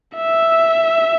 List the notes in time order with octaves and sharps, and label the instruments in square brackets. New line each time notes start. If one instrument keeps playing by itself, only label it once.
[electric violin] E5